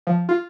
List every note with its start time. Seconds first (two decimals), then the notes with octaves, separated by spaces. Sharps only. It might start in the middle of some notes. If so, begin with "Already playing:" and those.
0.07 F3
0.29 F4